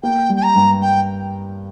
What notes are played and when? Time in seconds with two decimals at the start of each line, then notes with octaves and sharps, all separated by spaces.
0.03 A#3 G5
0.30 G3
0.36 G5
0.43 A#5
0.56 G2
0.82 G5